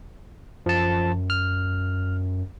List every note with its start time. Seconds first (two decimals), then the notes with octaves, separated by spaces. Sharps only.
0.66 F#2 F3 A5
1.30 F6